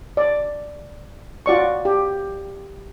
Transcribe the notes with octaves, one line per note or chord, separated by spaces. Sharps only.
D5
F4 F#4 D5 C#6
G4